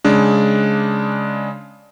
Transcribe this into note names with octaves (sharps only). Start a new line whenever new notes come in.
C#3 G#3 D4